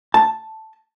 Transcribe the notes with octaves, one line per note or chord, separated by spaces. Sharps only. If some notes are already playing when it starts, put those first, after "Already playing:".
A5